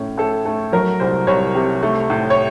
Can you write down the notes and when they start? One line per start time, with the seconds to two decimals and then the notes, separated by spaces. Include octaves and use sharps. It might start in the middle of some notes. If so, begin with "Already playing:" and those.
Already playing: A2 C#4
0.18 A2 A4
0.45 A3 A4
0.72 F#3 A#4
1.00 C2 C5
1.27 C2 C#5
1.55 C3
1.83 A3
2.10 A2
2.30 C#5